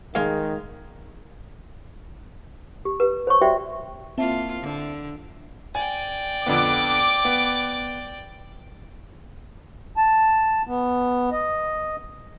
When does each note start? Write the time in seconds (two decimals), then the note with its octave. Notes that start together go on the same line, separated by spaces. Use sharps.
0.15 D#3 G#3 F5
2.85 G4
3.00 G4 B4
3.27 C5 C#5 C#6
3.41 F#4 G4 C5 D5 E5 G5
4.18 A#3 C4 E4 F4 E5 A5
4.60 D3
5.75 D5 G5 G#5
6.46 F2 D3 B3 D6
7.25 B3
9.97 A5
10.67 B3
11.32 D#5